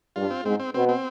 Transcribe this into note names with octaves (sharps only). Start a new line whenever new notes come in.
G2 G3 F4
C4
G#2 G#3 C4
C4
B2 B3 C4
C4